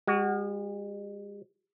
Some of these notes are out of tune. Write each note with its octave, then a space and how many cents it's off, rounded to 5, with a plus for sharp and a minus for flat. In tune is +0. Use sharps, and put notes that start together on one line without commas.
G#3 -40 F#4 +15